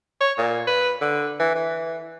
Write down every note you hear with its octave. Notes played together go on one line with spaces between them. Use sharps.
C#5
A#2
B4
D3
E3
E3